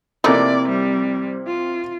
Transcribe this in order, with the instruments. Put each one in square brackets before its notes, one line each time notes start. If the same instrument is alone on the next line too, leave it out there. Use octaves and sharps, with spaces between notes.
[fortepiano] C3 A#3 E4 [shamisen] F3 A3 D#4 [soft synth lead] C4 [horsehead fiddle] D5
[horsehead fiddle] G3
F4